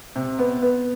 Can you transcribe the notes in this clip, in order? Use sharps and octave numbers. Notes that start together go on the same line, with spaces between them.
C3
B3
B3